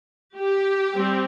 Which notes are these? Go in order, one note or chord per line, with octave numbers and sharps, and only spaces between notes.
G4
G3 C4